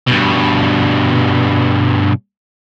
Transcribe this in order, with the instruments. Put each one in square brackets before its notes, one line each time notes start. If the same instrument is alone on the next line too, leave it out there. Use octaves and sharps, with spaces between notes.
[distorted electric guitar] G2 B2